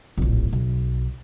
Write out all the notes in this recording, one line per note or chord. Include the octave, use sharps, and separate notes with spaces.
D1 A#1
B1